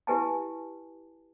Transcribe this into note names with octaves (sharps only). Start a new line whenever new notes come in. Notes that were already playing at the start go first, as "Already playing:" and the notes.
E4 G4 B4 G#5 A5